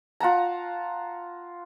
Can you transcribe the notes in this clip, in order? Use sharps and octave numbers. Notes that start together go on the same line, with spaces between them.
F4 F#5 A5 A#5